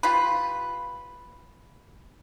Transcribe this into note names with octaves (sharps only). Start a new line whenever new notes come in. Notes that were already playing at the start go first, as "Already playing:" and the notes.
F4 G4 B4